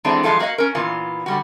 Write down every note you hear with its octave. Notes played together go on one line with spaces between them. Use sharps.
E3 G#3 A3 B3 C4 D4
E3 F3 G#3 F4 A4
A#3 F#4 C#5 D#5 F5
C#4 A#4
A#2 E3 B3 F4
D3 G3 F#4